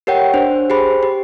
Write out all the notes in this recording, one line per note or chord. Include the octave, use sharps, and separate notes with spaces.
G4 A#4 C#5 F#5 G5
D4 C5
G4 G#4 C5 B5
G4